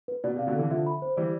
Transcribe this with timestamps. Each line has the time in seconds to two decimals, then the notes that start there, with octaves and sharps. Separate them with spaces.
0.08 B4
0.24 B2 D5
0.36 C3
0.39 F5
0.47 B2 D3
0.54 C3 E3 A4
0.70 D3 F3 E5
0.87 B5
1.02 C5
1.17 E3 G3 D5